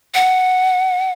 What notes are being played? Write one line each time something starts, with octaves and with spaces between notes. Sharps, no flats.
F#5